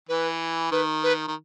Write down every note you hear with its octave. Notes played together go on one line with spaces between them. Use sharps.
E3 B4
D#3 B4
B4
D#3